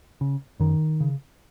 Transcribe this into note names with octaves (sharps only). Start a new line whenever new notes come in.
C#3
F#2 D#3
C#3